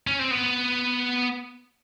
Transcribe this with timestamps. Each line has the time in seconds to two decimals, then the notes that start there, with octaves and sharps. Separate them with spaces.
0.07 C#4
0.19 C4
0.31 B3